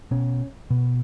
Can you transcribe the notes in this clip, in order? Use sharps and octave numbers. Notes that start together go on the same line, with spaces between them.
B2 C#4
B2